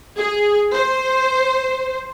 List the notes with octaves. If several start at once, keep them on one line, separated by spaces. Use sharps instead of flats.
G#4
C5